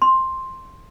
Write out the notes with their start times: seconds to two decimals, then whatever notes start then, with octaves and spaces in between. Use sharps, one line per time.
0.02 C6